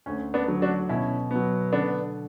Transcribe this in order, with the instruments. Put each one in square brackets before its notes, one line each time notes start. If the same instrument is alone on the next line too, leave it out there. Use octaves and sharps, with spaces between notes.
[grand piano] D2 [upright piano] C#4
[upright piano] B3 D4
[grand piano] D3 F#3
[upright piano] D4 F#4
[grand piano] B2 [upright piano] C#4 E4
[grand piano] F#3 B3
[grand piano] D3 [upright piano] B3 D4